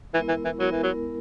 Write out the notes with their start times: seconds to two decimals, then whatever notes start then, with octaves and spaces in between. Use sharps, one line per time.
0.14 E3 G#3 B3 E4 A#4
0.28 E3
0.45 E3
0.60 F#3 G#3 B3 E4 A#4
0.71 E3
0.83 F#3